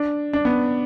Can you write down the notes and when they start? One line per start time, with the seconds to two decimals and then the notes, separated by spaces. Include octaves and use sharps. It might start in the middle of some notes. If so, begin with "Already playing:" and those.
Already playing: D4
0.33 D4
0.45 B3